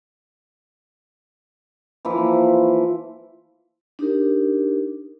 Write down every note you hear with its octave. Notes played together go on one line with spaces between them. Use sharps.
E3 F3 A#3 E4
D4 D#4 G4 A#4